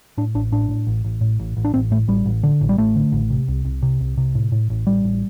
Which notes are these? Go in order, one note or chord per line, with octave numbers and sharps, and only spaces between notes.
A2 D4
A1 D4
A2 D4
A2
A1
A1
A2
A1
A1
D4
A1 C4
A2 A3
A1 G3
A1
D3
A1
G3
A1 A3
D3
A1
C3
C2
C2
C3
C2
C3
A2
A2
A1
A1 G3
A1